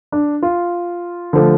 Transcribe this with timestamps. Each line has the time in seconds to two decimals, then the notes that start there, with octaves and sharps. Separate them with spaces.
0.12 D4
0.42 F4
1.33 D3 F3 A3